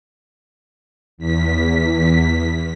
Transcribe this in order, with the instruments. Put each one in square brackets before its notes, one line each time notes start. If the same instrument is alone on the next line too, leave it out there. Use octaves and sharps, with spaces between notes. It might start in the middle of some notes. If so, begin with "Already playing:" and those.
[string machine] E2 B6